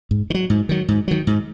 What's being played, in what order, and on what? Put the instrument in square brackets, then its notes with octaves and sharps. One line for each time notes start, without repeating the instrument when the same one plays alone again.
[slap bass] G#2
D#3
F#3
G#2
D#3 F#3
G#2
D#3 F#3
G#2